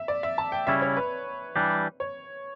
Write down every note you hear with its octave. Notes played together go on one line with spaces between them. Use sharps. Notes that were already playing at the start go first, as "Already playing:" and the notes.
Already playing: E5
D5
E5
A5
G5
C#3 G3 C#4 E4 E5
C#5
B4
E3 G3 D4 G4
C#5